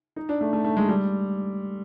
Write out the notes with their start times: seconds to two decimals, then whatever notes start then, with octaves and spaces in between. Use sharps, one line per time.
0.16 D#4
0.29 D4
0.41 A3
0.53 A3
0.64 A3
0.77 G#3
0.89 G3